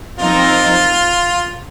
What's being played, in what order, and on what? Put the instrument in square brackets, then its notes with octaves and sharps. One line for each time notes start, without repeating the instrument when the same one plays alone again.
[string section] F3 C4 D#4 A#4 [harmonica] F4